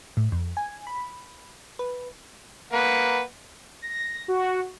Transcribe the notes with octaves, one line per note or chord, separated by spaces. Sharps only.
A2
F2
G#5
B5
B4
A#3 B4 F#5
A#6
F#4